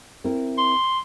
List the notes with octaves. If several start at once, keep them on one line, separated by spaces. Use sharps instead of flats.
C4 E4 A#4
C6